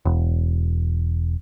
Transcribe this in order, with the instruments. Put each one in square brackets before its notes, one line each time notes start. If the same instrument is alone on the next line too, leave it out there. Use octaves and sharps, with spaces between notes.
[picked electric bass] E1